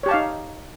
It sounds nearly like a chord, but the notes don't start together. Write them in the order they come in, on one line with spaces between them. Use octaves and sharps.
C#5 G4 A5 F5 D#4